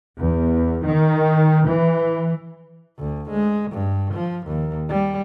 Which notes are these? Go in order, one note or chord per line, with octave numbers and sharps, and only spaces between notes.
E2
D#3
E3
D2
G#3
G2
F3
D#2
G3